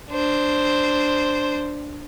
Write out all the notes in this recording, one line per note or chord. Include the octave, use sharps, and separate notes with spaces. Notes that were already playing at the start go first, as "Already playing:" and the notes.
D4 C5